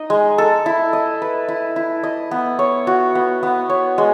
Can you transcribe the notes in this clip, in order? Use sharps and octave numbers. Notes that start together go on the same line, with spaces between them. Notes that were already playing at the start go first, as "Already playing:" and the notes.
Already playing: D#4 D#5
G#3
A4
E4
D#5
B4
E4
E4
D#5
B3
C#5
F#4
B3
B3
C#5
G#3